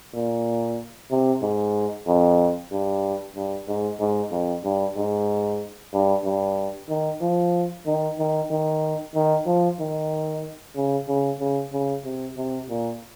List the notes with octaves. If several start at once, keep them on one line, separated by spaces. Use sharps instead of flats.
A#2
C3
G#2
F2
G2
G2
G#2
G#2
F2
G2
G#2
G2
G2
D#3
F3
D#3
D#3
D#3
D#3
F3
D#3
C#3
C#3
C#3
C#3
C3
C3
A#2